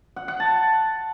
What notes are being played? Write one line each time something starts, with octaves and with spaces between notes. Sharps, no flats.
F#5
F#5
A5